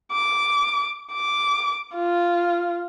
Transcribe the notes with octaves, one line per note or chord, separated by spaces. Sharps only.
D6
D6
F4